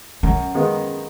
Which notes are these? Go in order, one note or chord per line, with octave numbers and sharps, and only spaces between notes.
F#2 C#4
D#3 G#3 B3 F4